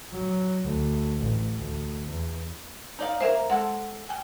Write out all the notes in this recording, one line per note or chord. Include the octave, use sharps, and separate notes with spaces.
F#3
D2
A1
D2
E2
D#4 D5 F5
A#3 A#4 C5 E5
G#3 A4 F#5
G5 G#5